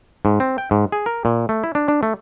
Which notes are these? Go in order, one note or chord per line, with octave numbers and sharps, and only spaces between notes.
G#2
C4
G5
G#2
G#4
A#4
A#2
A3
E4
D4
D4
A3